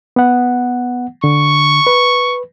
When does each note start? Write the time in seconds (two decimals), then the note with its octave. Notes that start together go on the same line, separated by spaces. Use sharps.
0.16 B3 F#5
1.24 D3 C#6
1.87 B4